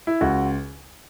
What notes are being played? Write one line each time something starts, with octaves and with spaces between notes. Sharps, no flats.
E4
C#2 F#4